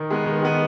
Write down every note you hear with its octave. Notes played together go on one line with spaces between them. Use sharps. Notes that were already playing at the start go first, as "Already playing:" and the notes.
Already playing: D#3
G#3 B3
D#3
G#3 B3